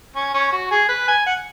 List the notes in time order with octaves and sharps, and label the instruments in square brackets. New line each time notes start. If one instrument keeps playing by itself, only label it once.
[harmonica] C#4
C#4
F#4
G#4
B4
G#5
F#5